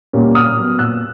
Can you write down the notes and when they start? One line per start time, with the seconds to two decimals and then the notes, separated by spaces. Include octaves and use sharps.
0.13 A#2 G3 A#3 C#4
0.35 A#2 D#6 F6
0.57 F#3 B3
0.79 A#2 E6 F#6